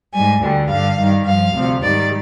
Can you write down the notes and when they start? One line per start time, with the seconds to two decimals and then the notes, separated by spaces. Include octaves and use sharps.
0.12 G#2 G3 G#5
0.41 D2 D3 G3
0.69 G2 D3 G3 F5
0.98 G2 D#3 G3
1.25 G2 F3 F5
1.54 D2 C3 F3
1.82 G#2 D#3 G3 D5